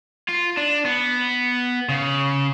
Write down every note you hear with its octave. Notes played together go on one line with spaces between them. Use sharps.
F4
D4
B3
C#3